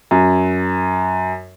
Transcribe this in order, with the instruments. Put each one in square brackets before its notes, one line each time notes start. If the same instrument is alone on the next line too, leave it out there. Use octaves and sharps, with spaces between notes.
[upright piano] F#2